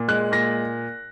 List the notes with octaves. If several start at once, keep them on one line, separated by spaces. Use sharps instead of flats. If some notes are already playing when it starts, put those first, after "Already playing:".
Already playing: A#2
G#3 F#6
A#2 A#6